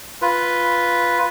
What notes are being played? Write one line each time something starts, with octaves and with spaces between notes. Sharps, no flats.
F4 B4